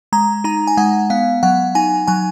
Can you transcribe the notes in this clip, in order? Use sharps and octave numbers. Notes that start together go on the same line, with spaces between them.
G#3 A#5
D#4 A#5
G#5
G#3 F#5
B3 F5
F#3 F#5
D#4 G#5
F#3 G#5